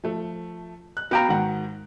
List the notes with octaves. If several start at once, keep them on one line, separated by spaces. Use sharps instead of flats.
F3 A3
F#6
B3 F#4 F5 G5 A#5
G#2 D#3 F#5